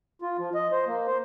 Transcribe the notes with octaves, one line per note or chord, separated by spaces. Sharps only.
F4
F3
D#5
C5
A#3
C5